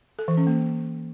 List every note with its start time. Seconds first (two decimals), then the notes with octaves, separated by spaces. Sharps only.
0.19 A4
0.28 E3
0.37 C#4
0.47 A#3